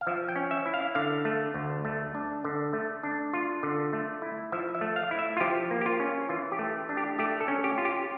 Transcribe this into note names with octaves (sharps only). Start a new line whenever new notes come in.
F5
F3 E5
G5
C#4
E5
E4
F5
D3 F5
A3
D2
A3
D4
D3
A3
D4
F4
D3
A3
E4
F3 E5
E5
A3
F5
E4
E5
F4
F3 G4
A#3
G4
F4
C#4
E3 F4
G4
A3
D4
G4
A3 G4
A4
C#4
G4
F4
G4